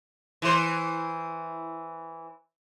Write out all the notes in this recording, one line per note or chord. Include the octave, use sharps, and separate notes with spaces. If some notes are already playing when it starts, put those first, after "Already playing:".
E3 C5